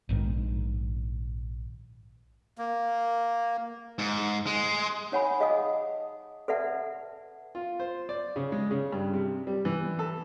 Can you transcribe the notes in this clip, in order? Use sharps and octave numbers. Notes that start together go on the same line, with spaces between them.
A#1 G#2 B2 D#3
A#3
G#2
G#3
D#4 C#5 F#5 G#5 B5
G#4 D#5 F5 F#5 A5 D#6
A4 B4 D5 E5 F#5 A5
F4
C5
D5
C#3
G#3
C#3
G2
C3
G3
E3
A4